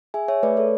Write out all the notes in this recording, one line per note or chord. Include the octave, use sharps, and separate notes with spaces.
G#4 E5 G#5
C#5 E5
A3 B4 D5
A4 C#5